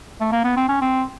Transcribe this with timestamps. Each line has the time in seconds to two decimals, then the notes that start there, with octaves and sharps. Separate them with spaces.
0.21 A3
0.32 A#3
0.44 B3
0.57 C4
0.69 C#4
0.82 C4